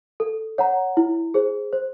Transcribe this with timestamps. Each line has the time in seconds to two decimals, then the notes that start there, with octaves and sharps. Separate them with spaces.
0.20 A4
0.58 C#5 F#5 A#5
0.97 E4
1.34 G#4 C5
1.73 C5